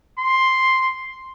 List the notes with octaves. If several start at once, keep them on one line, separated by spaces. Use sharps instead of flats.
C6